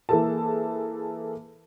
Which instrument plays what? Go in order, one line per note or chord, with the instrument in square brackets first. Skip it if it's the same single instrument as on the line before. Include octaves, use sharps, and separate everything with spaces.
[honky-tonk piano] E3 A#3 G#4 A4 A5